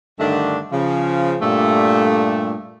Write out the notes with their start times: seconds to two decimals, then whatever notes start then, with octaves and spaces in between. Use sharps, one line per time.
0.20 G2 D3 D#3 A3 D4
0.71 C#3 F3
1.41 G2 A#2 G3 A3